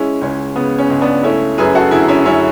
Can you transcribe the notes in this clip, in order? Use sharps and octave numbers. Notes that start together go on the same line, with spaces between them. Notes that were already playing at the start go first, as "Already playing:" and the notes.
Already playing: G#3 C#4 E4
C#2 C#4
C#3 B3
C#4
C#2
B3 D4
A3 C#4 E4
F#2 G#4 B4
F#4 A4
D3 E4 G#4
C#4 E4
F#2 C#4 E4